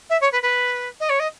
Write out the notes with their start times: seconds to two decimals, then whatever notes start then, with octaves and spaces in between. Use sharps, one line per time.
0.10 E5
0.21 C#5
0.32 B4
0.42 B4
1.00 D#5
1.09 C#5
1.19 D#5